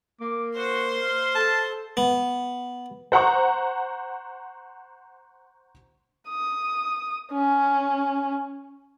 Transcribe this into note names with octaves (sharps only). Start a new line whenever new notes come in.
A#3 D6
F#4 C5 C6
F5
A4 A5
B3
C5 F#5 A#5 C#6
D#6
C#4